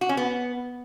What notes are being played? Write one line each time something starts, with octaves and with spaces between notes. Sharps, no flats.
F#4
C#4
B3